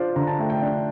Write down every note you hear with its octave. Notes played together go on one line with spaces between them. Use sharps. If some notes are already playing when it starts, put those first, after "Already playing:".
Already playing: D4 F4 C5 D5
D3 A#5
A5
A3 G5
G5
D4